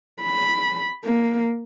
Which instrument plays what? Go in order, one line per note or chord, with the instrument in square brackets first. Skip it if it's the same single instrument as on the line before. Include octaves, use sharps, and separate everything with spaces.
[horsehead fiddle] B5
A#3